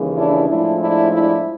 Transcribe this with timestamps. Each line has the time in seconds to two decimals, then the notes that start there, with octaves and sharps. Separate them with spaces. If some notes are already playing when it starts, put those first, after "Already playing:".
Already playing: D#2 C#3 E3 G#3
0.17 D4 E4
0.48 A2 F3 G#3 D4 E4
0.79 D4 E4
1.11 D4 E4